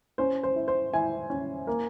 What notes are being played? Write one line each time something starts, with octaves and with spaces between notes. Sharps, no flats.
C#4 C5
C5
E4
C5
E4 G#5
C#4
A#3